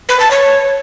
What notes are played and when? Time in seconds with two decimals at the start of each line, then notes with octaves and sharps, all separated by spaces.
0.09 B4
0.20 A5
0.31 C#5